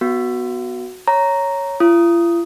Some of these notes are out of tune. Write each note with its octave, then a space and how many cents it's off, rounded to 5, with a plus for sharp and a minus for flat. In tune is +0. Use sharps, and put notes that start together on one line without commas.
B3 +0 F#4 +0
C#5 +0 A#5 +0
F4 -45 D#6 +0